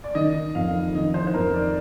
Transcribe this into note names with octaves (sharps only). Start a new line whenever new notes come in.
D5
D#3 D#5
F2 F5
D#3 D#5
C5
C5
F2 A#4
D5